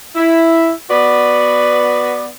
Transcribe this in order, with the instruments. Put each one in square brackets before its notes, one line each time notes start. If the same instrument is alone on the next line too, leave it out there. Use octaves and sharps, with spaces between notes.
[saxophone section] E4
B3 F#4 B4 D5